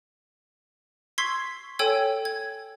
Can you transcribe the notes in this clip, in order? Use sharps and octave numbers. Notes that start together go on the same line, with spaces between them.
C6 C#6 E6 G#6 B6 C7
A4 C#5 G5 G#5 E6 G#6
G#6